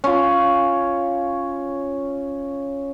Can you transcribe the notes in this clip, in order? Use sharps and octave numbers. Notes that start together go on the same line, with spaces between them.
C#4 F4